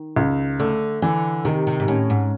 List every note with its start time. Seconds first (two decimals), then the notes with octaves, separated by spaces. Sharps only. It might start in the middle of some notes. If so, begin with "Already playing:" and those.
Already playing: D#3
0.16 C#2
0.60 D3 A3
1.02 D3 E3
1.45 C3 D#3
1.67 C3
1.80 G#2
1.88 A2 C#4
2.10 G#2